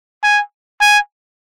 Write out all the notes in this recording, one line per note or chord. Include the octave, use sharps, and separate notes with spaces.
G#5
G#5